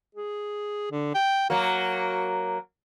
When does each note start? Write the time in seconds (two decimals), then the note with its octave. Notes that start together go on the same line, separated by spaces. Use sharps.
0.15 G#4
0.91 D3
1.15 G5
1.50 F#3 A#3 F#4